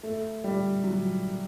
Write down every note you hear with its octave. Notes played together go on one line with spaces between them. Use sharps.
A3
G3
F#3